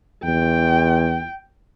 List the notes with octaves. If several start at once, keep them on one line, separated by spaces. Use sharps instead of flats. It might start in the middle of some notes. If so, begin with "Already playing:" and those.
E2 G5